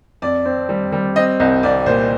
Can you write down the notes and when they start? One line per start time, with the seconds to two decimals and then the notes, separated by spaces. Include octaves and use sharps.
0.22 F2 D5
0.45 C4
0.69 G3
0.92 G3
1.16 C4 D#5
1.40 C2 D#5
1.63 C2 D5
1.86 A#2 C5